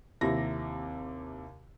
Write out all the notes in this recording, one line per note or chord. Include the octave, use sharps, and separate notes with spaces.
D#2 C3 E4 A#6